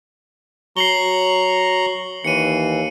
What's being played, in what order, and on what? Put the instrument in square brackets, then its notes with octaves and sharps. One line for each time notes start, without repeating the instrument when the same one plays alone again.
[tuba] F#3 [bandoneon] A#5 C#6 [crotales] C7 F#7 G7
[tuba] D#2 [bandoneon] E3 [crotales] C#7 D#7